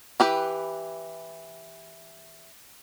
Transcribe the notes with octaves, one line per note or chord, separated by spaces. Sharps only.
E3 G4 B4